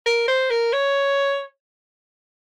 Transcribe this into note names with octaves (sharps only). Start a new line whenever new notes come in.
A#4
C5
A#4
C#5